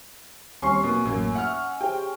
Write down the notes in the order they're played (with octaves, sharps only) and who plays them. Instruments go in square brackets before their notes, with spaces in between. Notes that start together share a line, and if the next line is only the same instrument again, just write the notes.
[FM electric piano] D#2 G3 C4 [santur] C#4 [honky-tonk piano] C6 C#6 C7
[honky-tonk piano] B2 [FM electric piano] A#3 B3
[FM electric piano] A1 A3 [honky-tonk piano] F#2 A#3
[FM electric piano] E5 [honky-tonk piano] F#5 F6
[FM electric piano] G4 G#4 C5 [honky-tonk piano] G5